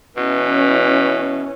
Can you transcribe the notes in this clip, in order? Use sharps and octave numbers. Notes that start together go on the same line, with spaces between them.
B2 E3 C#4